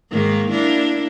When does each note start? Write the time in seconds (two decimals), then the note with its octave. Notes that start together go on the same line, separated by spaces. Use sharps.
0.10 G#2 D#3 A#3
0.51 A#3 D4 E4